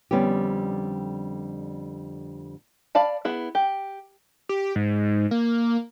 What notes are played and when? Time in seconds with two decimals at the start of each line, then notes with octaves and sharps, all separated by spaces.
0.11 F2 D3 G3 B3 C#4 G4
2.95 D5 F5 A5 B5
3.25 B3 E4 G#4
3.55 G4
4.49 G4
4.76 G#2
5.31 A#3